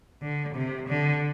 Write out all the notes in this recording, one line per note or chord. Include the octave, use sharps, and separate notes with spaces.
D3
C3
D3